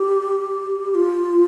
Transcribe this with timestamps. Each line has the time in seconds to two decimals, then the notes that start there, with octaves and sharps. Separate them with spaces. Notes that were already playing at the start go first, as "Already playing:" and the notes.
Already playing: G4
0.91 G4
0.95 F4